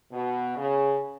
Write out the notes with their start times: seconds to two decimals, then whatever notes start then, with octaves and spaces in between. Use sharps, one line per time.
0.11 B2
0.57 C#3